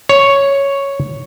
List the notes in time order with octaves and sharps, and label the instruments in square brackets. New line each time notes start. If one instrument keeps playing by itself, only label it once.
[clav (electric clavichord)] C#5